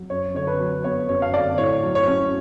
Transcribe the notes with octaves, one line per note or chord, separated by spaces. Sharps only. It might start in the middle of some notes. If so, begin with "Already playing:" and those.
Already playing: F#3
F#2 C#5
D3 C#5
B4
F#3
B3 C#5
F#2 C#5
F5
D3 D5
A2 C#5
F#3
C#5
C#4